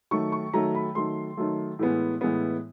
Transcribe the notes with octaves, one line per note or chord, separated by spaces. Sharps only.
D#3 F#3 A3 C#6
C#6
D#3 F#3 A3 A#5
B5
D#3 F#3 A3 C6
D#3 F#3 A3
A2 E3 G#3 B3
A2 E3 G#3 B3